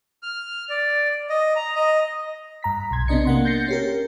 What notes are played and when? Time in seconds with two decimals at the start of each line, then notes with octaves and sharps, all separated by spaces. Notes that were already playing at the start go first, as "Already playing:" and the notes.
0.23 F6
0.69 D5
1.30 D#5
1.56 A#5
1.76 D#5
2.63 G2 A#5 B6
2.91 B1 C6 G#6
3.08 C3 B3 D4 D#5 C#7
3.25 A#3 F#5 C6
3.45 G6 A6 A#6 C7 C#7
3.68 C#4 G4 A#4